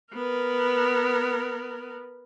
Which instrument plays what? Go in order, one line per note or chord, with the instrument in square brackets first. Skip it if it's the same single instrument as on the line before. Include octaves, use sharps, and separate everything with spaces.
[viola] B3 A#4